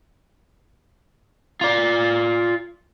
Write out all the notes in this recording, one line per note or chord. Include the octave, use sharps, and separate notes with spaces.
F4 D5